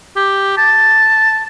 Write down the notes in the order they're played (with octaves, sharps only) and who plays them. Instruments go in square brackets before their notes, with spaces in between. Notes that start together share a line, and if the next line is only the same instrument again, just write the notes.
[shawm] G4
A5